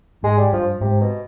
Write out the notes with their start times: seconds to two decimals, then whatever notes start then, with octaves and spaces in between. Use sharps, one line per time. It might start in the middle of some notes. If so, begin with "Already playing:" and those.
0.23 G#2 G#3
0.38 G3
0.52 G2 F3
0.81 G#2 C3
1.01 B2